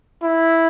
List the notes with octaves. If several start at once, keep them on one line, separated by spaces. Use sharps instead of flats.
E4